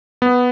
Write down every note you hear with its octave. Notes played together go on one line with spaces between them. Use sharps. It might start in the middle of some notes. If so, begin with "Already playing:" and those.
B3